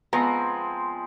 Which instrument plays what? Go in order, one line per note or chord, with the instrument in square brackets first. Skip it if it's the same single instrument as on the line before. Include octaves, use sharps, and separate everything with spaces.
[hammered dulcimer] F3 G#3 C4 [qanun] B3 [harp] A#5